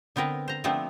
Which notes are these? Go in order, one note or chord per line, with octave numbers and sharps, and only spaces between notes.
D3 B3 C4 A#4 B4
C5 A#5
F3 A3 B3 C4 D4 F#5